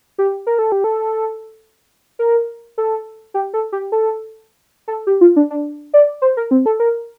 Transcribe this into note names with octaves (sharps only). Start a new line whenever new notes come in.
G4
A#4
A4
G4
A4
A#4
A4
G4
A4
G4
A4
A4
G4
F4
D4
D4
D5
C5
A#4
C4
A4
A#4